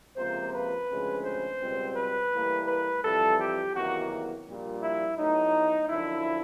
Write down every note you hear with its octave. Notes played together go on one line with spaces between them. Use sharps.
C#2 C3 F3 A#3 C5
B4
D2 C#3 F3 G#3 C4
C5
C#2 B2 G3 C4
B4
A2 E3 G3 A#3
B4
F2 C3 E3 G3 A4
G4
E2 C3 D#3 F#3 A#3 F#4
A#1 A#2 G3
E4
A2 F#3 B3 D#4
F#2 D3 F3 E4